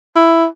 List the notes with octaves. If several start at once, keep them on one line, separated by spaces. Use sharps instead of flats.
E4